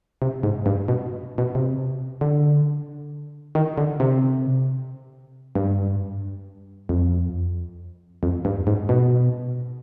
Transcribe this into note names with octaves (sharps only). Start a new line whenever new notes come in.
C3
G#2
G2
B2
B2
C3
D3
D#3
D3
C3
G2
F2
F2
G2
G#2
B2